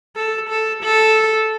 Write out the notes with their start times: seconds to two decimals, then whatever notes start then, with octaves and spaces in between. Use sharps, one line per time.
0.15 A4
0.49 A4
0.83 A4